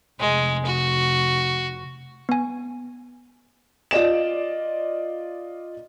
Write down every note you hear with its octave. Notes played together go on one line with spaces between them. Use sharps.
F1 G#3
F#4
B3 G#5
F4 D5 D#5 E7